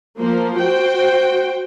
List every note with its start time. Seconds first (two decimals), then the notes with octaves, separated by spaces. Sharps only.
0.18 F3 A#3 C5
0.56 F#4 C5 G5